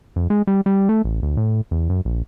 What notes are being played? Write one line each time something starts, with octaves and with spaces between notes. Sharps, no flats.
F2
G#3
G3
G3
A3
A1
D2
A2
E2
F#2
A#1